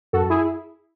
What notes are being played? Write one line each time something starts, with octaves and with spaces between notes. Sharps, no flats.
F#2 F#4 A4
E4 G#4